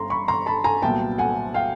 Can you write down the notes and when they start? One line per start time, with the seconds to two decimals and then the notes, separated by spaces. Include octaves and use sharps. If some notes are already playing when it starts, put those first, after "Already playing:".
Already playing: G1 G2 C#4 A#5 C6
0.10 B5 C#6
0.28 A#5 C6
0.46 A5 B5
0.64 G#5 A#5
0.82 C2 A#2 F#3 B3 G5 A5
1.18 F#5 G#5
1.54 F5 G5